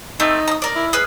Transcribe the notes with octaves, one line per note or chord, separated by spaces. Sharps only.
A3 C4 D#4
A#5 D#6
A#4 D5
E4
G#4 B4 F6